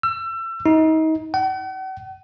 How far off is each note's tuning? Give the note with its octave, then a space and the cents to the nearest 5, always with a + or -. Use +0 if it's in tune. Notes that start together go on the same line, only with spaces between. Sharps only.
E6 +30
D#4 +30
F#5 +45